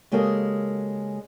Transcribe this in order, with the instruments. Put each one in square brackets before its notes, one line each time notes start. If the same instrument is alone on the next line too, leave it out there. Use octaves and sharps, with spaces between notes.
[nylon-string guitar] C#3 G#3 A#3 G4 A4 A#4